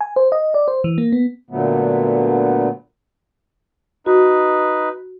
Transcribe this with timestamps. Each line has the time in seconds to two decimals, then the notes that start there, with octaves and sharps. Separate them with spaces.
0.01 G#5
0.16 C5
0.32 D#5
0.54 D5
0.68 C5
0.84 E3
0.98 A#3
1.12 B3
1.50 A#2 D3 F#3 A3 B3
4.06 D#4 F#4 B4